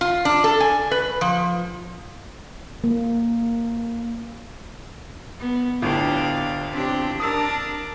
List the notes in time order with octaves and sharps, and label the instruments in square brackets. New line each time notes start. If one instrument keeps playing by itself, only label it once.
[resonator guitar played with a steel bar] F4
D4
A4
G#5
B4
F3
[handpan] A#3
[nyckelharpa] B3
[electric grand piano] G1 A2 F4 [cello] D4 G4 [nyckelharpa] F5
[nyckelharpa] C4 G4 [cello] D4
[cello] D4 [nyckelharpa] A#4 A5 [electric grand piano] D#6 E6